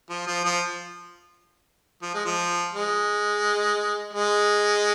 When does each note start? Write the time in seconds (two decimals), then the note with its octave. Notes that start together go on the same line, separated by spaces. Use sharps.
0.10 F3
0.27 F3
0.45 F3
2.02 F3
2.14 G#3
2.25 F3
2.73 G#3
4.13 G#3